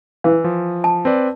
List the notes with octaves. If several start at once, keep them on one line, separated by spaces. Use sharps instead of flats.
E3
F3
A5
C4 B4 D5